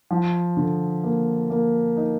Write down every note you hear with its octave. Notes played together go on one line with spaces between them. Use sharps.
F3
D3
A#3
A#3
D#4